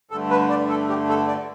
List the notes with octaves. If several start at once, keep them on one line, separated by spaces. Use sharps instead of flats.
G2 D3 A3 A4
B4
D5
A4
G4
A4
D5